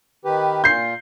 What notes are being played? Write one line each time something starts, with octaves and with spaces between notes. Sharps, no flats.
D#3 G4 B4
A#2 F4 G6 C7